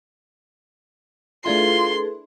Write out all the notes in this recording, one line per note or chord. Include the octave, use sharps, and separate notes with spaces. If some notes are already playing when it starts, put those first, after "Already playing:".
A3 D4 E4 F4 G#4 A4 B4 C6